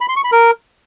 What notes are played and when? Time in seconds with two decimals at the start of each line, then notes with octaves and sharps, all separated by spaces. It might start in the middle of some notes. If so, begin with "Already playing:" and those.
0.01 B5
0.09 C6
0.16 C#6
0.24 B5
0.32 A#4